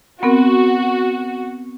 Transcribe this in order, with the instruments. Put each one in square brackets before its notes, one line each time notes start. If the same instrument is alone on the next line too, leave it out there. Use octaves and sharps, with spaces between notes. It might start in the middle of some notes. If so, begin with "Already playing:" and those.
[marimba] B3 C4 A#4 [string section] F#4